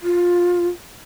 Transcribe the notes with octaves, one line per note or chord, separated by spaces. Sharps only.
F4